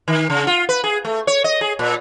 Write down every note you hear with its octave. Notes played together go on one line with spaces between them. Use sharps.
D#3
C#3
F4
B4
G#4
A3
C#5
D#5
G#4
A#2